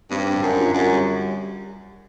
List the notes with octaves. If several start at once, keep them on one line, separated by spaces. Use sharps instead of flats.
G2 C4
D3
F#2
F4
F#2
G3